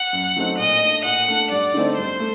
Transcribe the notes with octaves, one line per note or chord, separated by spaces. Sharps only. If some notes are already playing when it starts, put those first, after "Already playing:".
Already playing: F#5
F#2
F#3 A3 C4 D#4
A#2 D#5
A3 D4
A#2 F#5
A3 D4
G2 D5
D3 A3 C4 D#4
G2 C5
A3